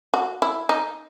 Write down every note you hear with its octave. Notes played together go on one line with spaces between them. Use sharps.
F#4
E4
D#4